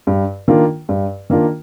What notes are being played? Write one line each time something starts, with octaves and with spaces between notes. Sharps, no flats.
G2
D#3 A#3 D4 F4
G2
D#3 A#3 D4 F4